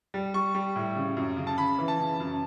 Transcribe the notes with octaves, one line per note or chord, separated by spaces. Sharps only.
G3
G3 C#6
G3
A2
C#3
F#2
C#3
A5
C#3 B5
E3
A5
C#3
F#2